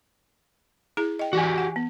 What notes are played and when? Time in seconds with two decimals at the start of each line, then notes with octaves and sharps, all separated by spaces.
0.97 E4 G#4 A#5
1.19 D#5 G5
1.33 E3 F#4 G4 G#5
1.58 F#5
1.76 B3